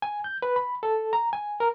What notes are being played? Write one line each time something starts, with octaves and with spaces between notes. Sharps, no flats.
G#5
G6
B4
B5
A4
A#5
G#5
A#4